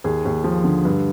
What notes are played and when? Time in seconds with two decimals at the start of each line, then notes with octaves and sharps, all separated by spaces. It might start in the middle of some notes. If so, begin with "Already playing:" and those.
0.04 D#2 G#4
0.25 D#2
0.44 F3
0.64 D3
0.85 G2